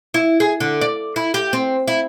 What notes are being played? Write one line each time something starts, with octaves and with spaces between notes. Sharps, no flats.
E4
G#4
D3
D5
E4
G4
C4
E4